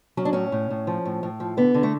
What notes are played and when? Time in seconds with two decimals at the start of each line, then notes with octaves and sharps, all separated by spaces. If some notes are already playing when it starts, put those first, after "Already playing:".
0.17 F#3 C#4
0.25 D4
0.33 A2 C#4
0.52 A2
0.70 A2
0.87 F3
1.05 A2
1.23 A2
1.40 F3
1.57 D3 B3
1.74 D3
1.83 A3